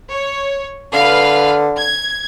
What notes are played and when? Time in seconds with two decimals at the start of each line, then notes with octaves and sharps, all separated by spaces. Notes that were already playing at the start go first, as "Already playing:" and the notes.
0.10 C#5
0.93 D3 B4 F5
1.78 G#6